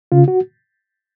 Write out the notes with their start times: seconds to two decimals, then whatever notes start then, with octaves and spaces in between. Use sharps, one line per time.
0.12 C#3 F4
0.28 F#4